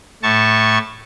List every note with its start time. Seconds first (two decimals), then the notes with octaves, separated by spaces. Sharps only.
0.23 A2 A5 C#6